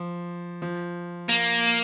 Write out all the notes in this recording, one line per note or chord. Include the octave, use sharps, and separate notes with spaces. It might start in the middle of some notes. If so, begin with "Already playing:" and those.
Already playing: F3
F3
A#3